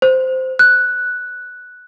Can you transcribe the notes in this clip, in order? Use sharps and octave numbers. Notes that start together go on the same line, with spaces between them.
C5
F#6